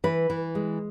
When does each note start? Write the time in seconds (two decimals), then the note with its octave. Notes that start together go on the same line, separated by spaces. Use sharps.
0.04 E3 B4
0.30 E3
0.55 G#3